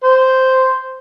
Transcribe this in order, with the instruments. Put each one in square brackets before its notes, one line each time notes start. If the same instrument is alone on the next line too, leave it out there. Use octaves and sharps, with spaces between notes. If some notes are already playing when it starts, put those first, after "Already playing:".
[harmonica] C5